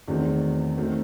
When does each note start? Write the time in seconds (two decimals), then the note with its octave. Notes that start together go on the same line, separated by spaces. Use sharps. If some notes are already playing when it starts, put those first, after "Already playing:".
0.08 E2 D#3 F#3 A3 C4
0.77 D#3 F#3 A3 C4